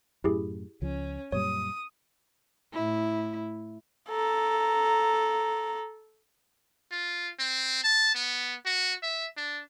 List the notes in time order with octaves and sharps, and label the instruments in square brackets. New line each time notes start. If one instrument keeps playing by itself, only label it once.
[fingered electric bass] F#2 A2 [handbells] E4 G4 G#4
[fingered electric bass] C#2 F3 [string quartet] C#4
[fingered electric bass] F#2 A#2 G3 [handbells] C#5 [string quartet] D#6
[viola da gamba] A2 E4
[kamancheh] A4 A#5
[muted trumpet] F4
C4
A5
B3
F#4
E5
D4